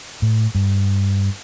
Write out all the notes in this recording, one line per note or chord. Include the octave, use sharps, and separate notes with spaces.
A2
G2